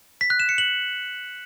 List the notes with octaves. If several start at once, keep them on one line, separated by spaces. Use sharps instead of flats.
B6
F#6
E7
C#7
F#7